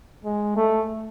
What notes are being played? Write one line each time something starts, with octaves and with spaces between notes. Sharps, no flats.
G#3
A3